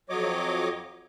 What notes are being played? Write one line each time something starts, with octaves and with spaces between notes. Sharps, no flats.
F2 F#3 C#5 D#5 D6